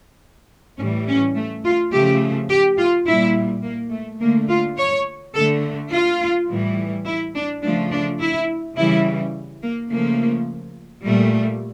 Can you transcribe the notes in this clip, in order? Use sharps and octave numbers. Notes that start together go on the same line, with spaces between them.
A2 E3 G3 C#4
C#4
A3
F4
C#3 F3 A3 G4
G4
F4
A#2 G3 E4
A#3
A3
D3 A3 A#3
F4
C#5
D3 A3 A4
F4
A2 E3 G3
E4
D4
C#3 F3 A3 D4
D4
E4
C#3 E3 G3 E4
A#3
C#3 F3 A3 A#3
A#2 G3 A3